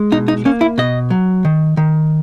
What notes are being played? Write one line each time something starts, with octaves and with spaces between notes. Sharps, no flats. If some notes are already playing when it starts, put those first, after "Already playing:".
Already playing: G#3
B2 D#4
D#4
A#3 C#4
E4
B2 D#5
F#3
D#3
D#3